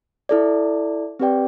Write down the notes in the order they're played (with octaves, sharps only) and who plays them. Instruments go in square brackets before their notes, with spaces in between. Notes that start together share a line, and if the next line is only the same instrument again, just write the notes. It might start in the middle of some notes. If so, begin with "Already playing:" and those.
[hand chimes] E4 A4 D5
C4 G4 B4 D5 G5